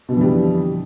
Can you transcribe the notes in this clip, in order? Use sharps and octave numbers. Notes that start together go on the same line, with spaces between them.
F2 B2 D3 E3 G3